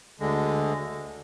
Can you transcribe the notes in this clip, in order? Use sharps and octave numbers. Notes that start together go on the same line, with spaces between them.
D2 D3 G#3